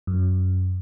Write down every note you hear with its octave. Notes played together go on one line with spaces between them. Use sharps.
F#2